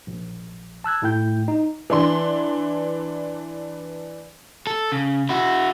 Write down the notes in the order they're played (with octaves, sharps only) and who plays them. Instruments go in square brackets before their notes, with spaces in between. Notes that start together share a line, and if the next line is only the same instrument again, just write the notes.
[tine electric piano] A#1
A5 E6 F#6 G#6
A2 A3 E4 G5 G6
D#4
[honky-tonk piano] E3 D4 C6
[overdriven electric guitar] A4
C#3
E4 F#4